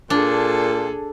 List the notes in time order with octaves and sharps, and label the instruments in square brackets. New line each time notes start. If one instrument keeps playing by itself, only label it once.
[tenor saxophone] A#2 [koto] D4 [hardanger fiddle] G#4 A4